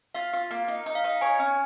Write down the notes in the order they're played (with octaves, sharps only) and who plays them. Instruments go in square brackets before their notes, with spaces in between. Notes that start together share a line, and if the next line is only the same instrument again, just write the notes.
[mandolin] F4 [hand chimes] F5
[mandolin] F4
A#3
D#4
D#4
[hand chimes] F5
[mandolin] D#4
[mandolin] C#5 [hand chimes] G#5
[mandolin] C#4